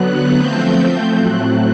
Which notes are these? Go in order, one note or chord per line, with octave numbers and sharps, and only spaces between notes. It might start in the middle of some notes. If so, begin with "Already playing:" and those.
Already playing: D3 F#3 B3 F#6
F3 A3 C4 G6
A2 F#3 A3 C4 F#6